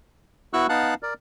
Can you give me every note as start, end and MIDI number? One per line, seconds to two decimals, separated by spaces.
0.53 0.67 59
0.53 0.67 64
0.53 0.67 66
0.53 0.67 85
0.53 0.67 88
0.53 0.67 90
0.69 0.94 59
0.69 0.94 63
0.69 0.94 77
0.69 0.94 78
0.69 0.94 81
0.69 0.94 90
1.03 1.14 70
1.03 1.14 74